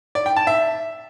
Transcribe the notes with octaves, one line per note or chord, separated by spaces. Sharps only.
D5
G5
A5
E5